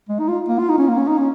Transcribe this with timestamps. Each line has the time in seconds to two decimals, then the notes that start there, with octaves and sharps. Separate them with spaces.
0.09 G#3
0.19 D#4
0.28 F4
0.48 A#3
0.58 F4
0.69 D#4
0.78 C#4
0.88 A#3
0.97 C#4
1.08 D#4
1.18 C#4